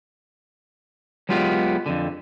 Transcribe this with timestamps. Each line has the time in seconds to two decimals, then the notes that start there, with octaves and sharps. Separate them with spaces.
1.29 F#3 G#3 B3 F4 G4
1.86 F2 D3